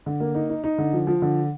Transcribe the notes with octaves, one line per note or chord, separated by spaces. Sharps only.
D3
A#3
D#4
D#4
D#4
D3
F3
F3
D3